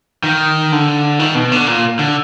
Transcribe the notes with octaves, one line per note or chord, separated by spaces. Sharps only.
D#3
D3
D#3
B2
D3
A#2
D3